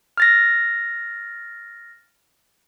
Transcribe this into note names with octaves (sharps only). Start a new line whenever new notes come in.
F6 A6 A#6